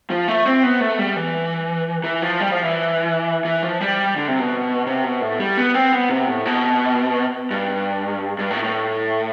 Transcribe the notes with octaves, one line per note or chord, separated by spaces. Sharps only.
F3
A3
C4
B3
A3
G3
E3
E3
F3
G3
F3
E3
E3
F3
G3
D3
C3
B2
C3
B2
A2
G3
B3
C4
B3
C3
A2
B2
G2
G2
A2
A2